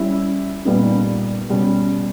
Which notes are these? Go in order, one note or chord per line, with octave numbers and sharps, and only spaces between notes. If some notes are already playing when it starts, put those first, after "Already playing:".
Already playing: G3 C#4 E4
A#2 G3 B3 D#4
B2 G3 C#4